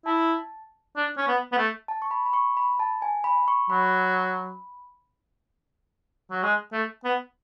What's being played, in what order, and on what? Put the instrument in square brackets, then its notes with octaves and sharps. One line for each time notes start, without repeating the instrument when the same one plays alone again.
[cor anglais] E4 [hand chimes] A5
[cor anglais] D4
C#4
B3
B3
A3
[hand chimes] A5
C#6
B5
B5
C#6
B5
A5
G#5
B5
C#6
[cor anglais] F#3 [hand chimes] B5
[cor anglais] F#3
G#3
A3
B3